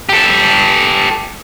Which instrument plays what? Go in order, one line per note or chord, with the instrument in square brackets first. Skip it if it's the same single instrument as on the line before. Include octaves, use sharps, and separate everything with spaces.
[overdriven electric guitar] G4 A4